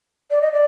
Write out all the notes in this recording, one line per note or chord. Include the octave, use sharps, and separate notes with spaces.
D5
D#5
D5